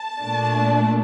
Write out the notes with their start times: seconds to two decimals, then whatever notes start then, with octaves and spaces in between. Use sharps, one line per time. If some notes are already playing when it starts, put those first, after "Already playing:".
Already playing: A5
0.21 A#2 A3 D4